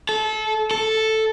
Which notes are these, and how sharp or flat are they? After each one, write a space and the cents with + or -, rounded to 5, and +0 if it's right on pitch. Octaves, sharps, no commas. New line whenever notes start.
A4 -25
A4 +0